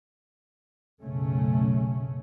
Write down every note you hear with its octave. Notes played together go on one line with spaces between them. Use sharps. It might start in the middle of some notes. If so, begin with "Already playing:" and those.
F#1 B1 C#3 A3 C#4